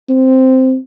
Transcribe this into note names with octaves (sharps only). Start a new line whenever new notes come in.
C4